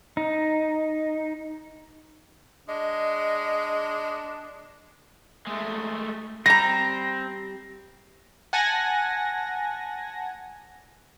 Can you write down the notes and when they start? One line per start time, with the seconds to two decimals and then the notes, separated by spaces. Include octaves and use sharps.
0.17 D#4
2.68 G#3 D4 D#5
5.47 G#3 A3
6.46 G3 C4 A#5 A#6
8.53 F#5 G#5 A5 G#6 A#6